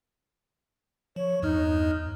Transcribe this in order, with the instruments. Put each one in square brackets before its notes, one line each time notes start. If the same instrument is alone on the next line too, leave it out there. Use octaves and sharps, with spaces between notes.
[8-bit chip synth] F3 [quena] C#5
[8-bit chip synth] E2 G2 F6 [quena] D#4